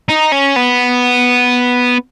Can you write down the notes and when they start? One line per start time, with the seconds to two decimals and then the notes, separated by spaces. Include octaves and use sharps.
0.09 D#4
0.32 C#4
0.56 B3